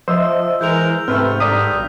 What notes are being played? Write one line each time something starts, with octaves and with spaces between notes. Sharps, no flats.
F3 C5 D#5 E5 E6
E3 G#3 A#4 G6 F7
G#2 C3 A3 C4 B4 F6
G2 D3 D5 A#5 D#6 B6
B1